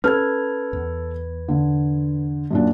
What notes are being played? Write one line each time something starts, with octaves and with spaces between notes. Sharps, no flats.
C#4 A4 B4 F6 G#6
E2
D3
F#2 A#2 D4